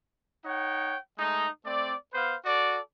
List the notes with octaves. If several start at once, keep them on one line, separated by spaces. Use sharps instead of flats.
D#4 C#5 F#5 G5
G#3 A3 D#4
A3 C4 D5
B3 B4 C5 F5
F#4 A4 D5